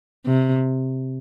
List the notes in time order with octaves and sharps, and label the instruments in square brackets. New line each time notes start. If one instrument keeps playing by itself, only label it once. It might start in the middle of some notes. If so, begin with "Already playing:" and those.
[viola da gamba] C3